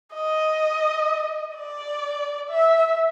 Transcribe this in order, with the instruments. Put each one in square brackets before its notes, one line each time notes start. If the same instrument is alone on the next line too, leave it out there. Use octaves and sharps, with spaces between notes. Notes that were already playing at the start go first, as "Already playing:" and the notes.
[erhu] D#5
D5
E5